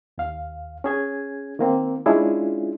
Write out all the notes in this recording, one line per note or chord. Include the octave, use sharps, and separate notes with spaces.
D#2 F5
C#4 G#4 G#6
D#3 A#3 C4
G#3 C#4 D4 E4 F4 G#4